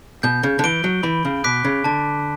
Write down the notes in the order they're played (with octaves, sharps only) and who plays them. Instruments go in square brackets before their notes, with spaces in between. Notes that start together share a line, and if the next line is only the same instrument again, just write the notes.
[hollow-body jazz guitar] B2 [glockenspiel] G6
[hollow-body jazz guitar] C#3
D3
[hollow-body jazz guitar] E3 [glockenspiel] D7 G7
[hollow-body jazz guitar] F#3
[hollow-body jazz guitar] E3 [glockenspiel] B5
[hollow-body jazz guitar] C#3
[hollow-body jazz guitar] B2 [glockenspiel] D6 F#6 B6 D7
[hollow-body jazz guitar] C#3
[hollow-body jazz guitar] D3 [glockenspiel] A5